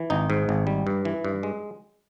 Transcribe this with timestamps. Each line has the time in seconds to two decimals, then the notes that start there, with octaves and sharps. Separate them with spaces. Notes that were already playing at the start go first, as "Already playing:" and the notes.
Already playing: E3
0.10 G#1 D#4
0.30 G#2
0.49 G#1
0.67 G3
0.87 G2
1.05 E3
1.25 G2
1.43 G#3